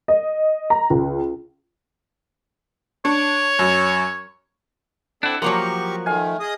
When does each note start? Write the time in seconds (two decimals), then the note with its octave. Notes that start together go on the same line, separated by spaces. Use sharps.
0.08 D#5
0.70 A#5
0.90 C#2
3.05 D4 C#5
3.59 F#2
5.23 C4 D4 E4 A4 D5 F#5
5.42 F3 F#3 A#3 G4 A#4 C6 C#6
6.06 D#3 A3 F5 G#5
6.40 G#4 D#5 D#6